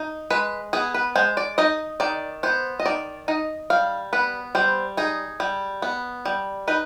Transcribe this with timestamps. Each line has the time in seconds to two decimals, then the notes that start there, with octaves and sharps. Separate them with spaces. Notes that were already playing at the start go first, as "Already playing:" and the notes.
Already playing: D#4
0.30 G#3 B4
0.73 B3 G#4
0.94 B4
1.16 G#3 C5
1.37 D5
1.58 D#4 D#5
2.00 D#3 D5
2.43 B3 C5
2.80 D#5
2.85 D#3 D5
3.28 D#4 D#5
3.70 G3 F5
4.13 B3 B4
4.55 G3 C5
4.97 D#4 G#4
5.40 G3
5.82 B3
6.25 G3
6.68 D#4 B4